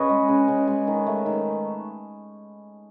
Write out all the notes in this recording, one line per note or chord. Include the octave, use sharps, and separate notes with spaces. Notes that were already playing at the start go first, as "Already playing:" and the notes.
Already playing: C#3 B4 C#5 D#5
G#3
C#3
C#3
G#3
D#3
A3
D#3